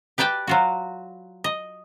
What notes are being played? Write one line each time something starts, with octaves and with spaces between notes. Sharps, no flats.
G4 B4 D5 G5 A5
F#3 F4 F#4
D#5